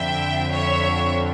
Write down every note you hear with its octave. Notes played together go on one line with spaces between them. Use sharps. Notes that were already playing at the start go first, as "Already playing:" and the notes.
Already playing: F2 D3 E5 G5
C#5 E5